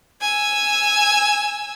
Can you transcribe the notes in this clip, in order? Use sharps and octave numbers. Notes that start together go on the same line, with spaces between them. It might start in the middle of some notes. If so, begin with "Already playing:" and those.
G#5 E6